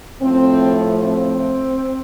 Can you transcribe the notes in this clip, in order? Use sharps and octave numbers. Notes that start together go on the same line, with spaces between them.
A2 F3 A3 C4
C4